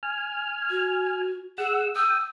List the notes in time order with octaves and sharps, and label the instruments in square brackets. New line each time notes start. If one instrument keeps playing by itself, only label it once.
[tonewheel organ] G#5 F6
[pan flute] F#4
[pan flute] G#4 [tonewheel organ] F#5 E6
[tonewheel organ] G5 D#6 [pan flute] E6